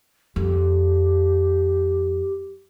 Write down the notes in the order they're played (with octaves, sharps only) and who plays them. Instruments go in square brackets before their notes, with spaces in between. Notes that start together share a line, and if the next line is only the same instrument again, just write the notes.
[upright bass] F2 [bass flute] G4